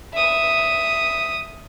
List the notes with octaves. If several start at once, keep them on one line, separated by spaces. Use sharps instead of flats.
E5 D#6